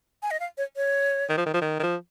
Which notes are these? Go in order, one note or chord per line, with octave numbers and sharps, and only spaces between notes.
G#5
D#5
F5
C#5
C#5
D#3
F3
D#3
F3
D#3
D#3
F3